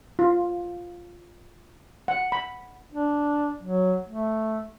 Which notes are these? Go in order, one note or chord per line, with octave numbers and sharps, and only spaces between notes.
F4
F#5
B5
D4
F#3
A3